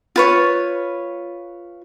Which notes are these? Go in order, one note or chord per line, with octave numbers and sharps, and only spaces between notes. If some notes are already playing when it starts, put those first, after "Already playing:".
F4 B4 C#5